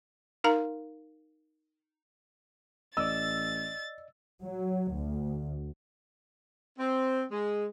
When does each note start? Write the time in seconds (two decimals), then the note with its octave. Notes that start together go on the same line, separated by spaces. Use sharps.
0.44 D#4 A#4 F5 A#5
2.97 A1 D5 D#5 E6 A6
4.43 F#3
4.95 D2
6.78 C4
7.30 G#3